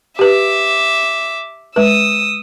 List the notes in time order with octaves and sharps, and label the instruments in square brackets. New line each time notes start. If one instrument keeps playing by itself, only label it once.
[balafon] G4 B4 [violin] E5 D6
[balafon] G#3 B4 [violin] D#6 E6